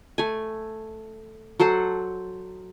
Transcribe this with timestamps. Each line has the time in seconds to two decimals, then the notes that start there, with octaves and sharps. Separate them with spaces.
0.18 A3 G#5
1.60 F#3 A4 C5 F#5